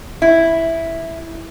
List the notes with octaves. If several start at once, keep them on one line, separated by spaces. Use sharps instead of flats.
E4